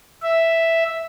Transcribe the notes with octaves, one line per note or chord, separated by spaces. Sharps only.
E5